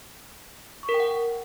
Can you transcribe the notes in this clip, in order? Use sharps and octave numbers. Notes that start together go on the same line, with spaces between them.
C#6
A#4
G5
F#5